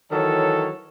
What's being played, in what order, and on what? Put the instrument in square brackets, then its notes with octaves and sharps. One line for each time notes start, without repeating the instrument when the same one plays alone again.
[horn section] D#3 E3 F#3 A4 C#5